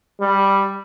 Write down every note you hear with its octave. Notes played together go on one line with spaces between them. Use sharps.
G3